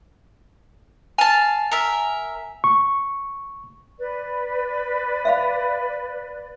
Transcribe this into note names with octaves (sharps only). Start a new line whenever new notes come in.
F5 G#5 A5
A#4 E5
C#6
B4 D5
E5 F5 B5